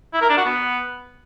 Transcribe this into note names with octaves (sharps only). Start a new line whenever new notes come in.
E4
A#4
D4
F#4
B3